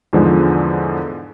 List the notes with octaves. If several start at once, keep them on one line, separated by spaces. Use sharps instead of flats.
E2 G#2 D3 F3 G#3